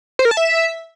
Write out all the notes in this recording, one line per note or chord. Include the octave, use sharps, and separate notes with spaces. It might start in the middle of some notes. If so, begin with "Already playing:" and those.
C5
A#4
A5
E5